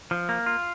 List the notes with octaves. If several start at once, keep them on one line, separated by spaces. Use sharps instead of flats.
F3
A#3
F4